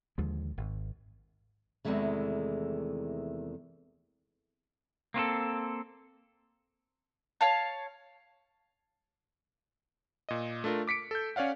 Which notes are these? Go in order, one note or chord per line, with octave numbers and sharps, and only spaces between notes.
D#2 D3 F3 G#3
G#1
E2 C3 D#3 E3 G#3 A3
A#3 C4 F4 A4
C#5 F5 A5
A#2 D#5
A3 D4 F4 A#4
D6 B6 C#7 D7
A4 G6
C#4 C#5 D5 F5 F#5